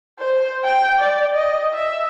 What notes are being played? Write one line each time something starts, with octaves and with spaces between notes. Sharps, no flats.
C5
G5
D5
D#5
E5